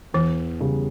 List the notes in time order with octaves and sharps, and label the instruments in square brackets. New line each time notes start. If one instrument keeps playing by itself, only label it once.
[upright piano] E2 [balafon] E3
[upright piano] C#3 G3